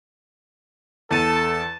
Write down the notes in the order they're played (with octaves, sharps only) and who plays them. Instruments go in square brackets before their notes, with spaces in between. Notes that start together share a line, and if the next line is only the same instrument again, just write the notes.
[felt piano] E2 D#7 [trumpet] A4 [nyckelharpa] A5